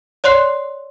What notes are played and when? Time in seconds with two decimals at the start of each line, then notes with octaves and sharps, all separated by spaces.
0.24 C#5 D5 C6 F#6 C7